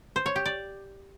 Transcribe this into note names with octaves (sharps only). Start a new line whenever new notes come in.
C5
C#5
G4
D5